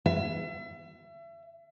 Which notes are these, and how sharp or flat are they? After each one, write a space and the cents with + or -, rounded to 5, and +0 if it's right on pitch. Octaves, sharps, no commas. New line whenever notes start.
E5 +35